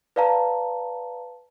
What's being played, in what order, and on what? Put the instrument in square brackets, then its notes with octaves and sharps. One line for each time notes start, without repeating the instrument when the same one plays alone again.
[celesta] B4 D5 F5 A5 A#5